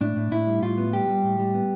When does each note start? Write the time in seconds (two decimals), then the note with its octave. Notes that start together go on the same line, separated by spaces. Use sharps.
0.01 A2 D4
0.16 A2
0.31 A2 E4
0.47 G3
0.62 A2 F4
0.78 B3
0.93 G3 G4
1.09 G3
1.23 A2
1.39 G3
1.54 B3